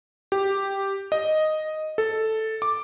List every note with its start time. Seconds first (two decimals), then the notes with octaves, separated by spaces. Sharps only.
0.32 G4
1.12 D#5
1.98 A4
2.62 D6